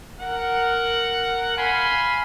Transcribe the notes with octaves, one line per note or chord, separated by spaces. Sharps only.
A#4 F#5
F5 G#5 B5 C6